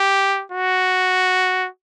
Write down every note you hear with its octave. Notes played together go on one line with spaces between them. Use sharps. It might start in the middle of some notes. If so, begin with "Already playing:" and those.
Already playing: G4
F#4